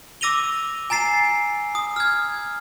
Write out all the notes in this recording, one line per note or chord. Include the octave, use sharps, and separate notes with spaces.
D6 E6 A#6 D#7 F7 G7
G#5 A#5 A6 C7 E7
D#6
F6 G#6